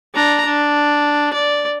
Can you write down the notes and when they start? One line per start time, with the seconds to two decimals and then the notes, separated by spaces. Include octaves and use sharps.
0.14 D4 A#5
0.45 D4
1.33 D5